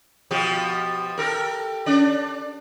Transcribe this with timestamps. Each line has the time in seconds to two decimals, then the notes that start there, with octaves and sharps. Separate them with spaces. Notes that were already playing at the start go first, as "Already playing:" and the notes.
0.31 B2 F3 G4
1.18 G4 A4 A#4
1.86 C#4 D4 D5